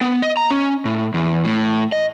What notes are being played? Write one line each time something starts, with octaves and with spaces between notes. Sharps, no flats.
B3
D#5
A#5
C#4
A2
E2
A2
D#5